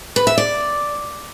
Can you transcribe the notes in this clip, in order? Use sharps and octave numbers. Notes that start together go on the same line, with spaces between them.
B4
E5
D5